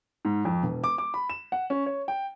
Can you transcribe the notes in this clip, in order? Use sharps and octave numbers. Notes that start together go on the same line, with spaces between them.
G#2
F2
E1
D6
D6
B5
E7
F#5
C#4
C#5
G5